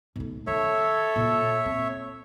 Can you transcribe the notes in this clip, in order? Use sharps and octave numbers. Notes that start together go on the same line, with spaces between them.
B1 A3
D#3 A4 C#5 E5
A#2 E4
C4